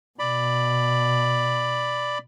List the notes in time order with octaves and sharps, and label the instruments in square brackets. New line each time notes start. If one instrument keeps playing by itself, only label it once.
[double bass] B2 [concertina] D5 B5